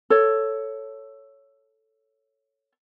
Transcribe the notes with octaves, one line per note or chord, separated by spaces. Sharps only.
A4 C#5